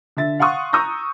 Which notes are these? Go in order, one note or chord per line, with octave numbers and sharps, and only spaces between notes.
D3 E5 A6
F5 F#5 C6 C#6 D#6 F#6
A#5 C#6 D#6 E6 G6 A#6